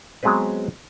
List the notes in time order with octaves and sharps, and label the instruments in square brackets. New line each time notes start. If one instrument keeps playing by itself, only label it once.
[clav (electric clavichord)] F#3 G#3 B3 C4 B4